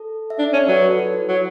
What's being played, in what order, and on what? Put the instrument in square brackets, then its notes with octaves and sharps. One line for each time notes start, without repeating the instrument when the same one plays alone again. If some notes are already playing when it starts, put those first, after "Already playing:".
Already playing: [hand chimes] A4
E5
[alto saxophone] D4
[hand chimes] D5
[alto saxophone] C#4
[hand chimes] C#5
[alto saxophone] F#3 [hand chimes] B4
[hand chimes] A4
F#4
E4
[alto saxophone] F#3 [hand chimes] F#4